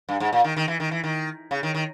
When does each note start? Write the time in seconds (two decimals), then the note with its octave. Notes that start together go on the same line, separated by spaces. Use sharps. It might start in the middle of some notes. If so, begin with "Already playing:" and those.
0.09 G2
0.20 G#2
0.33 A#2
0.44 D#3
0.57 D#3
0.68 E3
0.80 D#3
0.91 E3
1.04 D#3
1.51 C#3
1.63 D#3
1.75 D#3